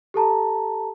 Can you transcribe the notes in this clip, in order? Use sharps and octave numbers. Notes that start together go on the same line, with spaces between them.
G4 A4 A5 A#5